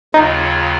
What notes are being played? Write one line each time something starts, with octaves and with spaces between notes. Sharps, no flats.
D#2 C#3 F#3 D#4 F4